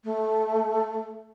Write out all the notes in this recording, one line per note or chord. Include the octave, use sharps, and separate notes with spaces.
A3